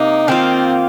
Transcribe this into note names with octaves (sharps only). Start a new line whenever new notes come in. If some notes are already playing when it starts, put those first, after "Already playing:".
Already playing: C3 A#3 D#4
D#3 A#3 C4 F4